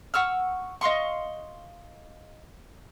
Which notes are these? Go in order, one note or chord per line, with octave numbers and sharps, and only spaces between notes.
F#5 C#6 E6 F6
D#5 F5 C6 C#6